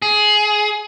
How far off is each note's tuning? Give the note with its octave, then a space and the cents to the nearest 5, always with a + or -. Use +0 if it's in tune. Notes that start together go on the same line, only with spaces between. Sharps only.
G#4 +15